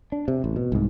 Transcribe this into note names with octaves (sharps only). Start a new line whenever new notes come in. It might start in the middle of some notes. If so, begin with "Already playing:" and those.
D4
C3
A1
B2
C2 G#2